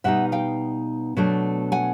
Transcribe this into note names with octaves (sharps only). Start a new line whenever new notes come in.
B2 G3 B3 D#4 E5 F#5
F5 G5
B2 F#3 A3 D4
F#5 G#5